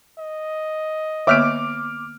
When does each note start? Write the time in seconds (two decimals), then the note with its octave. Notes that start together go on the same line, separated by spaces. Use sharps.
0.18 D#5
1.27 D3 A#3 B3 C#5 E5 D6 F6 D7